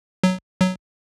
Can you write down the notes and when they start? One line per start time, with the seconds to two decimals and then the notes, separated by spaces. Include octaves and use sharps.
0.23 F#3
0.61 F#3